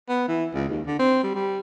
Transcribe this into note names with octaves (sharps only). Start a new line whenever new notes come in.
B3
E3
C#2
D#2
D3
C4
G3
G3